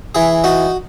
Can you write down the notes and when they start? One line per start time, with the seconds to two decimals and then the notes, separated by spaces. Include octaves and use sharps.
0.15 E3 G#4
0.44 D#4 F#4